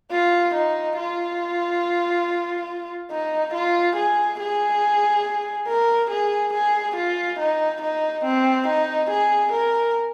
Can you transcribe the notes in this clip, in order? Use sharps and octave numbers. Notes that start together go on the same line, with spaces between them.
F4
D#4
F4
D#4
F4
G#4
G#4
A#4
G#4
G#4
F4
D#4
D#4
C4
D#4
G#4
A#4